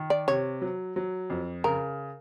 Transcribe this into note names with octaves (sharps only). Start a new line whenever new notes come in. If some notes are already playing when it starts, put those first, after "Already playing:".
Already playing: D#3
D5
C3 C#5
F#3
F#3
F2
C#3 A#4